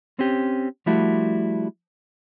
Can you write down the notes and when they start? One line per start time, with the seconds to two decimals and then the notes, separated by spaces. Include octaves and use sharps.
0.19 C4 C#4 G4
0.86 F3 G3 A3 E4 F#4